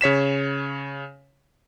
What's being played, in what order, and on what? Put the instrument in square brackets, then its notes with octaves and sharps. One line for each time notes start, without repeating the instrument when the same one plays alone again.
[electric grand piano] C#3 C#5 B6 E7